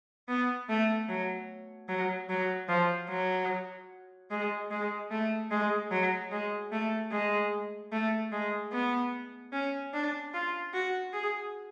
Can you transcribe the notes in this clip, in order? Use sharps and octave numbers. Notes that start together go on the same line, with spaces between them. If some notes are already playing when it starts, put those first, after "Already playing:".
B3
A3
F#3
F#3
F#3
F3
F#3
G#3
G#3
A3
G#3
F#3
G#3
A3
G#3
A3
G#3
B3
C#4
D4
F4
F#4
G#4